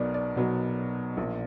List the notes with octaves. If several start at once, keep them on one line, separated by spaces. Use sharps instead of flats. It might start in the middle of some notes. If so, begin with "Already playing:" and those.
Already playing: B1 B2 F#3 B3 A#4 D5
D5
B1 B2 F#3 B3
A#1 A#2 A#3